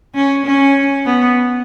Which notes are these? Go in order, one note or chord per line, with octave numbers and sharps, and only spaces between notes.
C#4
C#4
B3